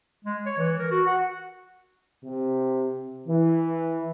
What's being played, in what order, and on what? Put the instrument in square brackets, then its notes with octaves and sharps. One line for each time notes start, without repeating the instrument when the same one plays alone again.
[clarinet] G#3
C#5
E3
A#4
F#4
F#5
[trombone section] C3
E3